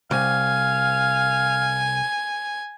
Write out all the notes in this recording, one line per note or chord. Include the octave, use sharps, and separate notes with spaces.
C2 F5 G#5